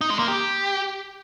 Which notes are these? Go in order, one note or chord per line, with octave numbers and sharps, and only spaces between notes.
D#4
G#3
A#3
G4